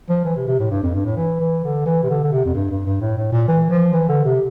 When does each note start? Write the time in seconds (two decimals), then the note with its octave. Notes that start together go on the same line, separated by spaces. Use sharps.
0.09 F3
0.25 E3
0.36 C3
0.48 C3
0.60 A2
0.71 G2
0.83 F2
0.95 G2
1.05 A2
1.17 E3
1.40 E3
1.64 D3
1.86 E3
2.03 C3
2.10 D3
2.24 D3
2.32 C3
2.45 F2
2.55 G2
2.71 G2
2.86 G2
3.01 A2
3.17 A2
3.32 A#2
3.48 E3
3.70 F3
3.93 E3
4.09 D3
4.25 C3